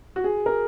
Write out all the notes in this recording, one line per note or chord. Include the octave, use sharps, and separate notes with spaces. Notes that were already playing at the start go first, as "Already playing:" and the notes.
F#4
G#4
A#4